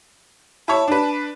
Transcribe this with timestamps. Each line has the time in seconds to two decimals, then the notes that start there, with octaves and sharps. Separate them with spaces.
0.68 E4 C#5 A5
0.88 D4 B4